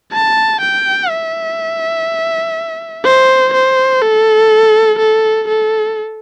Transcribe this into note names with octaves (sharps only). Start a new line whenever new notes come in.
A5
G5
E5
C5
C5
A4
A4
A4